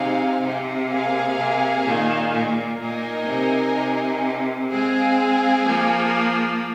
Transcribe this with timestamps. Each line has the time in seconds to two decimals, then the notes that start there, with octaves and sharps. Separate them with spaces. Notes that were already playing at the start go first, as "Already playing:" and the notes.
Already playing: C3 C4 D#4 G#4 F5
0.42 C3
0.89 A#3 G#4 F5 G#5
1.37 C3
1.85 A#2 D#3
2.33 A#2
2.80 A#2 D#4 A#4 D#5 G#5
3.27 C3
3.75 C3
4.71 G#3 C4 G#4 F5 G#5
5.66 F3 A#3